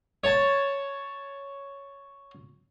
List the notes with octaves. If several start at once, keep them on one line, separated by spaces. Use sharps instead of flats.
C#5 A5